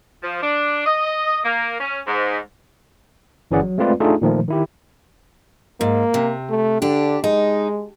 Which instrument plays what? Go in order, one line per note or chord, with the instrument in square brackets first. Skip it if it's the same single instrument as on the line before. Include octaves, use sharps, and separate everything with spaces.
[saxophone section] F3
D4
D#5
A#3
C#4
G#2
[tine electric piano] G1 E3 C#4 G#4 D5 F#5
F#3
G#3 A3 C4 F4 B4 D5
A3 D4 D#4 F4 G#4 A4
A#2 D#3 F3 A3
D#3 E4 G4
[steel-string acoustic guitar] G#2 [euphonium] A#3
[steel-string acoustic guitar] C3
[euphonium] A3
[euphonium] D3 [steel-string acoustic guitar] D4 G4
[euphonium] G#3 [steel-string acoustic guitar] D#4